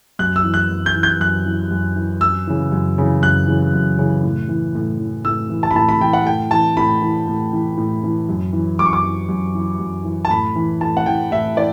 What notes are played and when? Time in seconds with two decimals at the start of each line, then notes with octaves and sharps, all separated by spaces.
0.19 F#2 F#6
0.36 E6
0.44 E3
0.54 F#6
0.70 F#2
0.86 G6
0.96 E3
1.03 G6
1.20 F#2 F#6
1.46 E3
1.71 F#2
1.96 E3
2.21 F#2 E6
2.47 C#3 E3
2.72 F#2
2.98 C#3 E3
3.22 F#2 F#6
3.47 C#3 E3
3.73 F#2
3.98 C#3 E3
4.23 A2
4.49 E3
4.75 A2
4.99 E3
5.25 A2 E6
5.50 E3
5.63 A5
5.71 B5
5.75 A2 A5
5.89 B5
6.01 E3 G5
6.13 F#5
6.25 A2 G5
6.51 E3 A5
6.77 A2 B5
7.02 E3
7.27 A2
7.53 E3
7.77 A2
8.03 E3
8.29 F#2
8.53 E3
8.79 F#2 D6
8.86 C#6
8.93 D6
9.03 E3
9.29 F#2
9.55 E3
9.79 F#2
10.04 E3
10.25 A5
10.30 A2 B5
10.56 E3
10.81 A2 A5
10.97 F#5
11.06 E3 G5
11.31 A2 E5
11.57 E3 D5